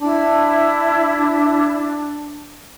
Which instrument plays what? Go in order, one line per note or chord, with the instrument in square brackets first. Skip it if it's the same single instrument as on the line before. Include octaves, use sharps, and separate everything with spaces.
[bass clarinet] D4 [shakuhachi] E4